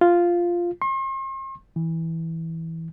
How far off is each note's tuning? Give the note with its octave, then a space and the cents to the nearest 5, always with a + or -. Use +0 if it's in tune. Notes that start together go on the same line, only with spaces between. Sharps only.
F4 -5
C6 +45
E3 -15